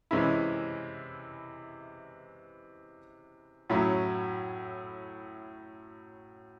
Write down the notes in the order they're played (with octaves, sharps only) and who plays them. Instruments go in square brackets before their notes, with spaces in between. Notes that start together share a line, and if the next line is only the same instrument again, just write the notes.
[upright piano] C3 E3 G#3 C#4 E4
A2 F#3 C#4 E4